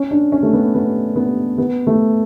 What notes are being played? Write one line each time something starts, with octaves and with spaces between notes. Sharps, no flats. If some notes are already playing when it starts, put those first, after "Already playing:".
Already playing: C#4
D4
C#4
A3
B3
B3
B3
B3
A3